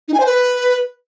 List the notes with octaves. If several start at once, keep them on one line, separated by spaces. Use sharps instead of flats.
D#4
G#5
C5
B4